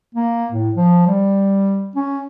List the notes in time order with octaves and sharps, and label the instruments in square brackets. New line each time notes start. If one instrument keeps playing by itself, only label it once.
[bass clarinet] A#3
A2
F3
G3
C#4